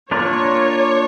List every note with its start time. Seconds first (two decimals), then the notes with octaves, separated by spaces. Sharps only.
0.11 A#3 D4 F4 A#4 C#5 D5